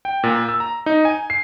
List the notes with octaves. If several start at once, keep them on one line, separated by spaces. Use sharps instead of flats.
G5
A#2
E6
A#5
D#4
G#5
C7